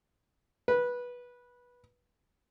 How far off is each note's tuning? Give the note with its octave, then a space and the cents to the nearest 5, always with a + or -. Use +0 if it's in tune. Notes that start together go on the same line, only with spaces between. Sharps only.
B4 -15